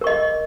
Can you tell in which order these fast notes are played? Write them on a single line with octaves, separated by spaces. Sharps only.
A#4 C#6 D#5